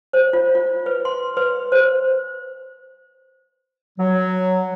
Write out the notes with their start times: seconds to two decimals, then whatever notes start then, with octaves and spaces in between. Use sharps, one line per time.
0.13 C5
0.33 F4
0.55 F4
0.86 B4
1.05 C6
1.37 B4
1.72 C5
3.99 F#3